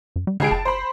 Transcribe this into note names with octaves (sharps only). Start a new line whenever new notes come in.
F#2
G3
C#2 D3 G#4 D7
F#1 A5
C5 B5